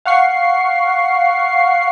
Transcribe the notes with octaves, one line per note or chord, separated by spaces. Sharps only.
F5 F#5 C#6 C7